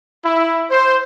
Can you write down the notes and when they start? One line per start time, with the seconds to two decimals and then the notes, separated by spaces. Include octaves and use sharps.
0.25 E4
0.70 C5